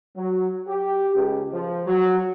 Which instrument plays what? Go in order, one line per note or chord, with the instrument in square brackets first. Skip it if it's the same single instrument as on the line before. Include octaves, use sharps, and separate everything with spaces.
[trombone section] F#3
G4
C#2
F3
F#3